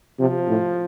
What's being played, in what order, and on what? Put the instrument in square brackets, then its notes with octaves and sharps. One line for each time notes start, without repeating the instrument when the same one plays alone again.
[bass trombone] C3 [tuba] F3
[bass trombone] A2